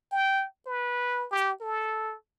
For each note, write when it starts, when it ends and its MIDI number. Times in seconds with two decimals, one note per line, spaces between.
0.12 0.45 79
0.66 1.26 71
1.31 1.52 67
1.61 2.15 69